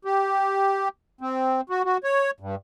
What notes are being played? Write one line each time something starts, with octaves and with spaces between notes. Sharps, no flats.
G4
C4
F#4
F#4
C#5
G2